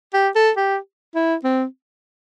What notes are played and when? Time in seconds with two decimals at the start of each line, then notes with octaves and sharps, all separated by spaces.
0.14 G4
0.35 A4
0.57 G4
1.15 E4
1.44 C4